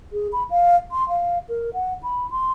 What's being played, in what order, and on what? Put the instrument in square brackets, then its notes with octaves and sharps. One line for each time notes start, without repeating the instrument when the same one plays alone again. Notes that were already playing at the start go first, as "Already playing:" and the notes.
[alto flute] G#4
B5
F5
C6
F5
A#4
F#5
B5
C6